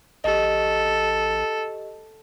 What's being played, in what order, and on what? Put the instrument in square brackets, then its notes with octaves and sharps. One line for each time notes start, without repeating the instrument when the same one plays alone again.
[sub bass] A1 [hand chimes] G4 D#5 [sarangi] A4